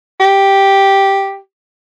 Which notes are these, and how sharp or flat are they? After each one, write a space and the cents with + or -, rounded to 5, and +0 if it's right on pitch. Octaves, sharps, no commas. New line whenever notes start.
G4 +0